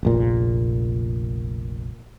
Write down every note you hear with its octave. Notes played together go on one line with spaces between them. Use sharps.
F1 A#1 A#2